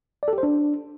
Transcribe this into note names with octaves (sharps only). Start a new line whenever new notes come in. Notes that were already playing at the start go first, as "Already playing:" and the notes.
D5
A4
G4
C5
D4